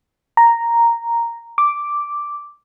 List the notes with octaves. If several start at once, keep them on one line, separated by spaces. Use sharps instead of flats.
A#5
D6